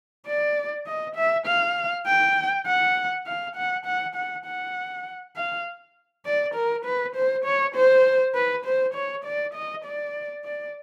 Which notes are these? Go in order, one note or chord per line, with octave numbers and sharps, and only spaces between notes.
D5
D#5
E5
F5
G5
F#5
F5
F#5
F#5
F#5
F#5
F5
D5
A#4
B4
C5
C#5
C5
B4
C5
C#5
D5
D#5
D5
D5